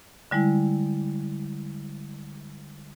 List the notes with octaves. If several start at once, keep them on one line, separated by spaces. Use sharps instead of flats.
D3 G3 G#3 E4